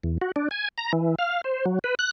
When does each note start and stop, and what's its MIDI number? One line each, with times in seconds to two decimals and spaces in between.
0.03 0.18 40
0.21 0.32 66
0.36 0.49 62
0.51 0.68 80
0.78 0.92 82
0.93 1.15 52
1.19 1.41 77
1.44 1.65 72
1.65 1.79 54
1.84 1.95 71
1.99 2.11 90